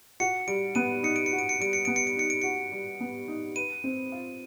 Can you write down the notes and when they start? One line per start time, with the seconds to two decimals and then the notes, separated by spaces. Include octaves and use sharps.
0.20 F#4 C#7
0.47 G3 D7
0.75 B3 D#7
1.03 D#4 C#7
1.16 D7
1.26 C#7
1.32 F#4
1.39 D7
1.49 C#7
1.60 G3 D7
1.73 C#7
1.85 B3 D7
1.96 C#7
2.07 D7
2.16 D#4 C#7
2.30 D7
2.42 F#4 C#7
2.72 G3
3.00 B3
3.28 D#4
3.56 B4 D#7
3.84 C4
4.12 F4